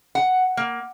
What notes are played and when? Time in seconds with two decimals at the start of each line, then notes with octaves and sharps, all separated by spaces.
0.15 F#5
0.57 A#3